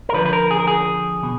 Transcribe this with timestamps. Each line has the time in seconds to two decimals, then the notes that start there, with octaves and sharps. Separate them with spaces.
0.09 A#4
0.13 D3 F3 B4
0.26 B4
0.33 A#4
0.51 G#4
0.60 A#4
0.67 G#4
1.23 B2